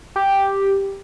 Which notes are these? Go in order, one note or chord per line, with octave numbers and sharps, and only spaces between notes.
G4